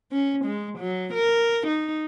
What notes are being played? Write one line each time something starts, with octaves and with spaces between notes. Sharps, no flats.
C#4
G#3
F#3
A#4
D#4